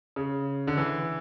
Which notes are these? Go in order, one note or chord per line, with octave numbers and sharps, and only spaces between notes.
C#3
D3
E3